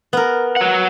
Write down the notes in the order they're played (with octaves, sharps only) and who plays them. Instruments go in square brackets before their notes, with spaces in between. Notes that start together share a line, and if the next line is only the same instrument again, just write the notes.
[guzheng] B3 A#4
[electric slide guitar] F#3 F#5